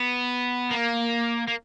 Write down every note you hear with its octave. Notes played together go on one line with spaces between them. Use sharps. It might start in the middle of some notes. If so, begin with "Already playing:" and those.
Already playing: B3
A#3
A#3